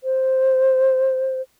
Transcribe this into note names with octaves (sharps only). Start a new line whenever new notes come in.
C5